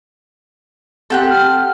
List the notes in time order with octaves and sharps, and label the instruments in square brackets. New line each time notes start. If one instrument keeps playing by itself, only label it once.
[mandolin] C4 G4 F#6 [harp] A4 F#5 G5
[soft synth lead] F6